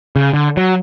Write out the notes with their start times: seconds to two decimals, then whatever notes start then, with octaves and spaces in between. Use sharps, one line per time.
0.16 C#3
0.34 D3
0.57 F#3